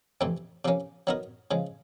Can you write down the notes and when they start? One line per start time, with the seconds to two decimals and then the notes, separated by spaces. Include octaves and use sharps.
0.21 F2 C3 E3 A3 C4
0.65 C3 F3 A#3 C#4
1.07 F#3 B3 D#4 F#4 A#4
1.51 C#3 F3 G#3